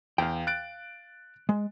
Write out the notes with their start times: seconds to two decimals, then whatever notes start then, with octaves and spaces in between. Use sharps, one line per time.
0.18 E2 F5 G5
0.47 F#6 A6 D7
1.49 G#3